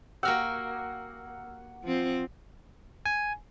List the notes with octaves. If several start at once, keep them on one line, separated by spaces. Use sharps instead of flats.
A#3 F#4 G4 F#5 E6 F6
F3 C4
G#5